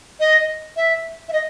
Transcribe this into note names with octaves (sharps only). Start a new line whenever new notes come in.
D#5
E5
E5
D#5